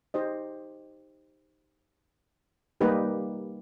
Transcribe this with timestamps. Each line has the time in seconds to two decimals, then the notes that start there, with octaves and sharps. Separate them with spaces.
0.14 D#4 G4 C5 D#5
2.81 G3 A#3 D#4 G4 B4